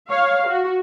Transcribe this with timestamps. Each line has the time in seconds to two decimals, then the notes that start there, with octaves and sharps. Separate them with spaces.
0.10 C#5 F5
0.48 F#4